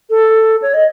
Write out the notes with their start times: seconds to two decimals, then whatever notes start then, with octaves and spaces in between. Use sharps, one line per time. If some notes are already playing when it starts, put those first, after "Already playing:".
0.10 A4
0.62 C#5
0.74 D#5